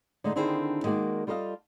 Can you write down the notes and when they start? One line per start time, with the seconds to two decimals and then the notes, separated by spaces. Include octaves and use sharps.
0.24 D3 G#3 A3 D#4
0.36 D3 D#3 C4 D4 E4 G#4
0.83 D#3 G#3 A#3 F#4 D5
1.27 G3 F4 A4 B4 D#5 F5